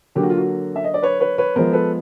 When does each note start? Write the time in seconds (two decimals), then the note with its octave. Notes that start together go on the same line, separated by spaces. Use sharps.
0.15 D3 F#3 A#3 G4
0.23 F#4
0.30 F4
0.37 F#4
0.76 E5
0.84 D#5
0.94 D5
1.03 B4 C#5
1.20 B4 C#5
1.38 B4 C#5
1.56 F3 G#3 B3 A#4 C5
1.73 A4 B4